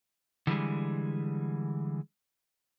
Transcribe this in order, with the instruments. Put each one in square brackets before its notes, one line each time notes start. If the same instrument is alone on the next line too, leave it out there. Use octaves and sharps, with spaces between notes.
[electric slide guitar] D3 E3 G3 G#3